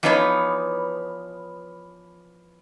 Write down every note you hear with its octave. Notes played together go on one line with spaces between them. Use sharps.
E3 F3 B3 D#4 B4 C#5